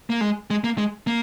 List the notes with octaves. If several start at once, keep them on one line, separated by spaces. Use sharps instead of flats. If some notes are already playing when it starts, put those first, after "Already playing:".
A#3
G#3
G#3
A#3
G#3
A#3